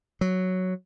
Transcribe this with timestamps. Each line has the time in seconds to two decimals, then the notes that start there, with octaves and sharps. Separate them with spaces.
0.21 F#3